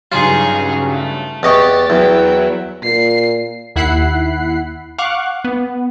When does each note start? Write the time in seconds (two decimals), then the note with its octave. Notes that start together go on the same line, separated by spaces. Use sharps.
0.12 G2 C#3 F#3 D#4 F4 G#4
0.87 A3
1.43 E2 G4 D#5 C#6 A6
1.90 E2 F#3 E4 G5
2.84 A#2 C7
3.76 D#2 E4 F#5 B5 F#6 C7
4.98 F5 F#5 C#6 D6 F#6
5.44 B3